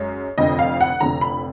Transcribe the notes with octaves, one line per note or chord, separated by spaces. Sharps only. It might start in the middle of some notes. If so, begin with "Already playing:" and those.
Already playing: F#2 G#3
F1 F2 D3 D#5
F5
F#5
F1 F2 D3 A#5
B5